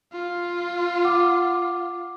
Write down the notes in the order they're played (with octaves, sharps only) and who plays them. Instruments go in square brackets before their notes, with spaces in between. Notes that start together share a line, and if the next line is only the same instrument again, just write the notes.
[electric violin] F4
[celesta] F#5 D6